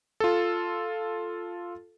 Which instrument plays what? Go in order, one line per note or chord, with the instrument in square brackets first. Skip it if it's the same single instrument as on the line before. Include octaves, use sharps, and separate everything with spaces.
[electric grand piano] F4 A4